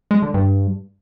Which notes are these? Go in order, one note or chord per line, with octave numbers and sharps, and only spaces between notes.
G#3
D3
G2